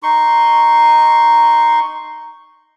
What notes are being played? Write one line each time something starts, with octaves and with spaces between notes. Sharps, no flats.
D#4 C6 C#6